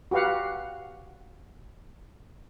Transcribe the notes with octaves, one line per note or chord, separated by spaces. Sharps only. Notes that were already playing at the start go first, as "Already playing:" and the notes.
F#4 G4 B4 F5 F#5